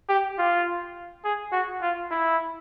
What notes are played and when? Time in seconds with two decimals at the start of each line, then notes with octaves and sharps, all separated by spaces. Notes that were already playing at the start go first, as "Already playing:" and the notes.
0.09 G4
0.38 F4
1.24 G#4
1.52 F#4
1.82 F4
2.11 E4